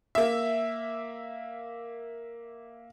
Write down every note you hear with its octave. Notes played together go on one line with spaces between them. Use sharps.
A#3 E5